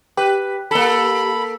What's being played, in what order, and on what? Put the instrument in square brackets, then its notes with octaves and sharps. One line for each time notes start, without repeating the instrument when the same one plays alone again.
[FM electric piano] G4 [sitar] B4
[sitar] A#3 A4 [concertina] B5